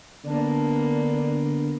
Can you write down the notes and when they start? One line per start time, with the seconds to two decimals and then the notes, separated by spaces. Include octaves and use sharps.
0.25 D3 A#3 B3 D4